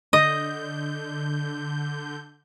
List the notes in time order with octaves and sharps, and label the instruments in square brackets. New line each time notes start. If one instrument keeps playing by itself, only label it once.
[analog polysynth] D3 G6 [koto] D#5